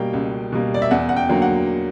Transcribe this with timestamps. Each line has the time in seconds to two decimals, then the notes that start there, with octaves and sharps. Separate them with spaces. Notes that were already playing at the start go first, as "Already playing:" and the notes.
Already playing: B2 G3 A#3 G5
0.13 C#2
0.52 B2 G3 A#3
0.74 D5
0.82 E5
0.91 E2 F#5
1.09 F#5
1.16 G5
1.29 D3 F#3 A#3
1.42 F#5